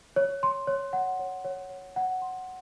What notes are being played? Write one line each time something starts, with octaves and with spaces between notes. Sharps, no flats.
C#5
C6
C#5
F#5
C#5
C#5
C#5
F#5
C6